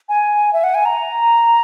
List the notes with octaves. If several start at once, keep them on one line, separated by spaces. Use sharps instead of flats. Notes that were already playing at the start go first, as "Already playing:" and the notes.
G#5
E5
F#5
G#5
A#5